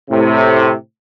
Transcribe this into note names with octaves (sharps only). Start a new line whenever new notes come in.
A2 C3